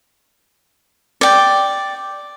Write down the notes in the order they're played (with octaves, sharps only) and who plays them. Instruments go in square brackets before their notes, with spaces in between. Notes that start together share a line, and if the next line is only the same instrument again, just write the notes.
[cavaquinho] D5 G5